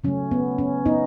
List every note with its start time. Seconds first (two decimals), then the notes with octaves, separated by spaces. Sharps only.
0.04 C#3 F#3 A3 C#4
0.31 B3
0.58 C#4
0.86 B3 D#4